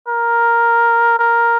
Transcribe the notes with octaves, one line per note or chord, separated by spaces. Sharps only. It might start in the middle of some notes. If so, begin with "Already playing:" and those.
A#4
A#4